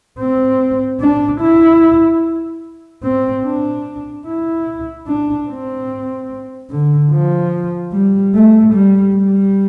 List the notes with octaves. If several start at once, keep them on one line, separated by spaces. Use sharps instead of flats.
C4
D4
E4
C4
D4
E4
D4
C4
D3
F3
G3
A3
G3
G3